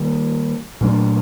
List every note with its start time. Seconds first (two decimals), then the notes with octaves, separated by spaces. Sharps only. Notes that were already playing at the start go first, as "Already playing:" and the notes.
Already playing: D#3 G3 A#3
0.81 A#2 F#3 A3 D4